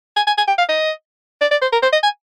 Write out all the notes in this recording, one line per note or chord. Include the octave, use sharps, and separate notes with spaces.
G#5
G#5
G#5
G5
F5
D#5
D5
D5
C5
A#4
C5
D#5
G#5